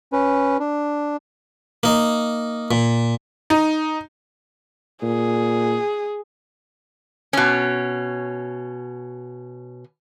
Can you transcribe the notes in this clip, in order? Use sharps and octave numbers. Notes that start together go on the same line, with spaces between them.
C#4 B4
D4
A#3 D#4
A#2
D#4
A#2 G#4
B2 C#4